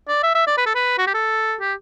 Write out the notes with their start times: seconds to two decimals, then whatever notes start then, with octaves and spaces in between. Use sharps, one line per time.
0.08 D5
0.23 E5
0.35 E5
0.47 D5
0.57 B4
0.66 A4
0.75 B4
0.98 F#4
1.07 G4
1.14 A4
1.60 G4